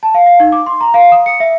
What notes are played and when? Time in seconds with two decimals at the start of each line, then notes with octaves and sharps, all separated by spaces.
0.03 A5
0.14 F5
0.26 F5
0.40 D#4
0.52 D6
0.66 C6
0.81 A#5
0.94 F5
1.12 D#6
1.26 C#7
1.40 E5